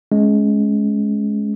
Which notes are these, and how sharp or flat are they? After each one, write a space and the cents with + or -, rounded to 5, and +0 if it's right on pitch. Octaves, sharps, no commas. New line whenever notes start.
G#3 +20 C#4 +0